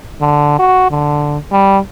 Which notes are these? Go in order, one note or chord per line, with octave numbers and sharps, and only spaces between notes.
D3
F#4
D3
G3